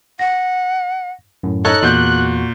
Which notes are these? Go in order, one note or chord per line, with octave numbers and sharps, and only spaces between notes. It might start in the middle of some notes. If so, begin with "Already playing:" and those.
F#5 A#6
F#2 A2
D#4 A4 C#5 D#5 F#6
E2 A#2 F#4 G6